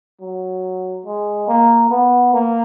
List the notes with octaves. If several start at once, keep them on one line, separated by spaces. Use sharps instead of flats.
F#3
G#3
A#3
B3
A#3